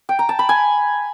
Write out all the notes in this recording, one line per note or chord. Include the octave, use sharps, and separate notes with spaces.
G5
A#5
A5
B5
G#5